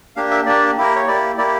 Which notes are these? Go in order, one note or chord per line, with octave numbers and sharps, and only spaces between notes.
A#3 D4 G4 F5
E5
A#3 D4 G4 D5
A#3 E4 G4 A#4
C#5
A#3 E4 G4 D5
A#3 E4 G4 D5